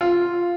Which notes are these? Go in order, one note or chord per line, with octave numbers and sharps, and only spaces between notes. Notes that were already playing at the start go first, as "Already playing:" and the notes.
F4